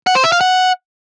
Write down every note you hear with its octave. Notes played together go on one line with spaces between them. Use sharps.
F#5
C5
E5
F5
F#5